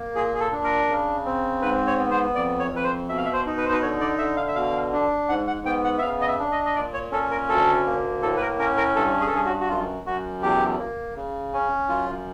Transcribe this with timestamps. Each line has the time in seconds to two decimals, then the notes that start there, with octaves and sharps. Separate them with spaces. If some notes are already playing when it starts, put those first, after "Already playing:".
Already playing: A#3
0.15 A#2 G#4
0.34 G#4
0.40 A4
0.52 D4
0.64 A#4
0.89 C#3
1.25 C4
1.62 G#2 B4
1.87 C#5
1.98 B3
2.11 C5
2.35 F2 D5
2.59 C#5
2.72 F2 B4
2.84 C5
3.09 B2 E5
3.18 F5
3.25 E5
3.33 C5
3.46 D#4
3.58 B4
3.65 C5
3.72 B4
3.82 D3 C#5
4.01 D5
4.18 D3 E5
4.37 F5
4.48 E5
4.55 B2 F5
4.93 D4
5.29 G#2 F#5
5.47 F#5
5.66 B3 G5
5.84 F#5
5.98 E5
6.02 C#3 F5
6.21 D#5
6.27 E5
6.39 D4
6.52 D#5
6.65 D#5
6.75 A#2 D5
6.93 C#5
7.12 C#4 A4
7.31 A#4
7.49 D2 A4
7.86 A#3
8.22 A2 A4
8.37 B4
8.41 A#4
8.59 C#4 A#4
8.77 A#4
8.96 G2 A4
9.21 G#4
9.27 A4
9.33 G2 G#4
9.45 F#4
9.60 F#4
9.69 F#2 F4
10.06 F#2 F#4
10.42 E2 G4
10.79 A#3
11.16 C#3
11.53 C#4
11.89 F#2 F4